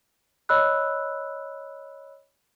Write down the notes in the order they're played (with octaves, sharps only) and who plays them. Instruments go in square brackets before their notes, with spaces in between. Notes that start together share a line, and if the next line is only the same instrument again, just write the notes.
[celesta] C#5 D#5 B5 E6 F#6